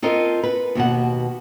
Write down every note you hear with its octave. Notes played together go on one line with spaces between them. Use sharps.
C4 F4 A4 A#4 D#5
B4
D#2 B2 F#5